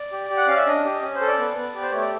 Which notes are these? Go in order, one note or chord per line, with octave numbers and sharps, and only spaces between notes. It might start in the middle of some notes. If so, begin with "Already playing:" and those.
Already playing: D5
G4
G4
F#5
C#4 F5
E5
D4 D#5
G4
C#4
C5
A4
D5
B3
B3
G4
C5
A3 C#5
D5